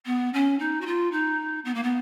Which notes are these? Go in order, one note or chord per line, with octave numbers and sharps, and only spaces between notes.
B3
C#4
D#4
F#4
F4
D#4
B3
A#3
B3